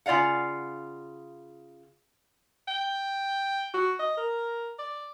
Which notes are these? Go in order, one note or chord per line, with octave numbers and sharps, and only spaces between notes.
C#3 F4 D5 F5 F#5
G5
F#4
D#5
A#4
D5